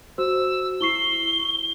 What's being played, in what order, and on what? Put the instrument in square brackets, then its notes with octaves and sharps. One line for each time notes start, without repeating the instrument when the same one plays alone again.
[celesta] F#4 C5 [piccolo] E6
[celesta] E4 C#6 C7 [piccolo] G7